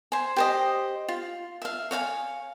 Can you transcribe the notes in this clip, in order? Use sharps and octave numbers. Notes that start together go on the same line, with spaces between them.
C5 G#5
G4 C5 D#5
F4
E5 F5
C#5 F5 G5 G#5